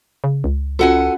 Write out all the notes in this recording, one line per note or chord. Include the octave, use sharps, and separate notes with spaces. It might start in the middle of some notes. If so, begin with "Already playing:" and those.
C#3
C#2
C#4 F4 F#4 A4 F#5 G#5